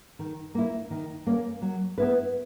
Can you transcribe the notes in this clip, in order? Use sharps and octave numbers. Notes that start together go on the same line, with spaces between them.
D#3
A#3 E4
D#3
A#3 C#4
F#3
B3 E4 B4